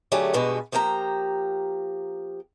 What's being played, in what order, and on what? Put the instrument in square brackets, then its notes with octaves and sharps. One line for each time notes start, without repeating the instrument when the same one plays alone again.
[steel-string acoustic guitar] D3 F#3 A3 G4 G#4
G2 B2 G#3 F#4 B4
F3 A#3 G4 G5 A#5